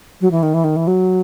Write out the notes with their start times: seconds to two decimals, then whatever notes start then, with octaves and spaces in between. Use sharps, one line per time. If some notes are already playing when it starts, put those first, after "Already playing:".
0.21 F#3
0.31 E3
0.43 D#3
0.54 E3
0.64 D#3
0.76 E3
0.87 F#3